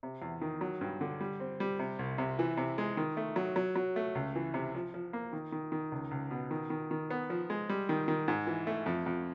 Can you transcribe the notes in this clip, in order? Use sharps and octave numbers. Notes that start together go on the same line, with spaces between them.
C3
E2
D#3
F#3
G2
D3
G3
C4
G3
C3
C2
C3
E3
C3
G#3
D#3
A3
F#3
F#3
F#3
A3
C#2
E3
C3
F3
F3
A#3
D#3
D#3
D#3
C#2
C#2
B2
D#3
D#3
D#3
B3
F3
G#3
G3
D#3
D#3
G#2
E3
A3
F2
F2